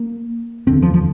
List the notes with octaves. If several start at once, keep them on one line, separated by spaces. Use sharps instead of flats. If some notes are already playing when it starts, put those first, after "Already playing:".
Already playing: A#3
F1 D#2 D3 C4
F3
F3